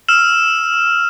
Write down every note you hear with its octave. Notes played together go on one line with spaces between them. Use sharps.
E6 F6 E7